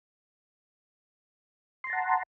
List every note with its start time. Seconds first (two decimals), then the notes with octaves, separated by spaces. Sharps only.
1.84 C6
1.87 A#5
1.90 A5
1.93 F#5